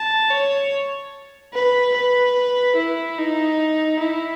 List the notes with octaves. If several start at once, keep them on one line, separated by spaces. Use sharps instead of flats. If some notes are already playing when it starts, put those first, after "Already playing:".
Already playing: A5
C#5
B4
B4
E4
D#4
E4